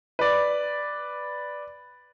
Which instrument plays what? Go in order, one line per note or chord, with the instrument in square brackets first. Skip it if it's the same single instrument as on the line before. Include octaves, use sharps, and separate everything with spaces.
[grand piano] B4 D5